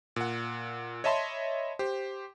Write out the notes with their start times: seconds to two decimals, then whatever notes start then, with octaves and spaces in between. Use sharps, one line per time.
0.16 A#2 F#5
1.04 C#5 D#5 E5 A5 B5 C6
1.79 G4 C5